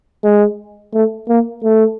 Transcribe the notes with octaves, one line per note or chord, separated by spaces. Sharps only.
G#3
A3
A#3
A3